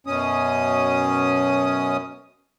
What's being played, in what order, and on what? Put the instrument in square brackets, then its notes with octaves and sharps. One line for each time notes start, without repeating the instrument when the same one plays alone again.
[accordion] F#2 B2 C#4 D#6